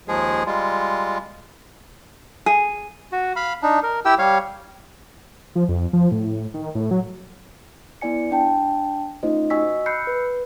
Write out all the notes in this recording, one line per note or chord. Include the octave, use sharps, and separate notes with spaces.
D#2 F3 G#3 G#4
G3 G#3 F4
G#4
F#4
F5 B5
D4 D#4
A#4
E4 G4 G5 E6
G3 C#5 F5
F3
F2
F3
A2
D#3
A2
F#3
B3 E4 D5 G#5 C#7
D4 G5 A5
A3 C#4 D#4 F4 C5 D#5
F#4 D#5 G#5 C#6 E6 B6
B5 E6 F#6 G6 C7 C#7
B4